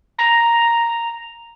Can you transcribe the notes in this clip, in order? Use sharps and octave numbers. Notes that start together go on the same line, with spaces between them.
A#5